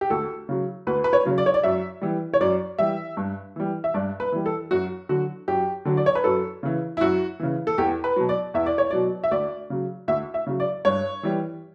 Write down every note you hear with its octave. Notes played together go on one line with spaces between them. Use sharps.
G4
D2 A4
C#3 F#3
D2 B4
B4
C#5
C#3 F#3
D5
C#5
D5
F#2 E5
E3 G3
C#5
F#2 D5
E3 G3 E5
G2
E3 G3
E5
G2 D5
B4
E3 G3
A4
F#2 F#4
D3 F#3 F#4
F#2 G4
D3 F#3
D5
C#5
B4
F#2 A4
C#3 E3
E4
F#2 F#4
C#3 E3
A4
E2 G4
B4
B2 F#3
D5
E2 E5
D5
C#5
B2 F#3 D5
E5
D2 D5
C#3 F#3
D2 E5
E5
C#3 F#3
D5
G2 C#5
E3 G3